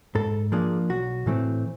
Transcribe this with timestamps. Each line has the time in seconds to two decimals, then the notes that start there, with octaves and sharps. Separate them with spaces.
0.15 G#2 A4
0.52 F3 A#3 D4 G#4
0.89 B1 F#4
1.26 A2 E3 A3 C4